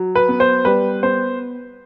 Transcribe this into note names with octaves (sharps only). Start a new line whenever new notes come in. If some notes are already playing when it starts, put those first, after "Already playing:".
Already playing: F#3
B4
B3
C5
G3 B4
B3 C5